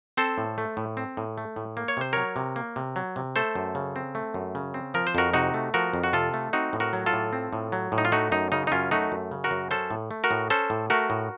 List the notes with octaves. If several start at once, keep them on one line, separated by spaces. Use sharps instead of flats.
C4 A4 C5
A2
A3
A2
C4
A2
A3
A2
A#3
C#5
C3 C5
F#3 A#4 C#5
C3
A#3
C3
F#3
C3
A3 A4 C5
F#2
C#3
C4
A3
F#2
C#3
C4
F3 A#4
C5
F2 F#4 A#4
C3 D#4 F#4
A3
F3 F#4 A#4
F2
F#4
C3 F4 A4
A3
C4 D#4 F#4
A2
F#4 A#4
F#3
F4 A4
A2
C4
A2
F#3
A2
D#4
F4
A3 D#4 F#4
F#2 D#4
C#3 D#4
D#4
F#2 C#4 F4
A3 D#4 F#4
F#2
C#3
F#4 A#4
F#2
C#4 A4 C5
A2
A3
F#4 A#4
A2
C#4 A4 C5
A2
A3 F#4 A#4
A2